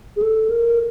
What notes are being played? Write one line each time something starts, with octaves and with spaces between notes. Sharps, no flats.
G#4
A4
A#4